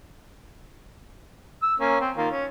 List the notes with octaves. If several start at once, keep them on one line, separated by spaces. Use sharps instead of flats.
E6
A#3 C#4
C4
D#3 A#3 F4
C#4